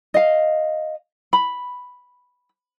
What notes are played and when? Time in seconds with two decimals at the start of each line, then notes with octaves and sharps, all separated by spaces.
0.14 D#5 F5
1.33 B5